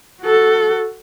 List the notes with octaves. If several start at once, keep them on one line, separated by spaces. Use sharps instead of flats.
F#4 A4